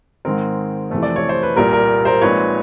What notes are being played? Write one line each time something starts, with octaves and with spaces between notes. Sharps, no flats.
G#2 D#3 G#3 C4 A#4
F2 C3 E3 A3 C4
D5
C#5
C5
B4
C2 A#2 G3 A#3 A#4
A#4
A#4 C5
A#2 F3 G#3 C4 D#4 B4 C#5